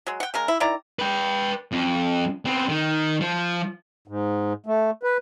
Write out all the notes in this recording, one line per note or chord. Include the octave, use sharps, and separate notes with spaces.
F#3 G#3
F#5 G5
C#3 G#3 A#4
E4
D#3 E4 D5 A#5
B4 G5
F2
B3 C4
D#3
F3
G#2
A3
B4